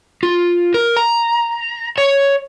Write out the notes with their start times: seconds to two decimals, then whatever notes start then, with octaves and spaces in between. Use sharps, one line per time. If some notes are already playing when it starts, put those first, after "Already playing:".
0.23 F4
0.74 A#4
0.97 A#5
1.98 C#5